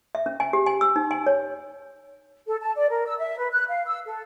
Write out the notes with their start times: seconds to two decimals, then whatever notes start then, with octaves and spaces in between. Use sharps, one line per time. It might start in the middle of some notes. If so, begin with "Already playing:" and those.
0.15 E5
0.26 C#4
0.40 G#5
0.53 G4
0.66 G#5
0.81 E6
0.96 D#4
1.11 G#5
1.26 C#5
2.47 A4
2.61 A5
2.76 D5
2.89 A#4
3.06 E6
3.19 E5
3.38 B4
3.52 F#6
3.69 F5
3.86 E6
4.06 A4